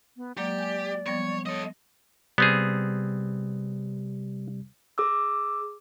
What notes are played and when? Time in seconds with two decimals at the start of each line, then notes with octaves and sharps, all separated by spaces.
0.17 B3
0.37 F#3 G#3 A#3 G4 D5
0.58 G#5 G6
1.07 F3 G3 B3 C#5
1.46 A4 C#5 D#5
2.38 C3 G3 B3 C4 G#4
4.98 G#4 D6 E6